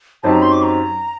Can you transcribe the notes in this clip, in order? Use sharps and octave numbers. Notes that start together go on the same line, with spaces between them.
F#2 F#3 C4 D#4 G4 A5
A#5
C6
D6
A#5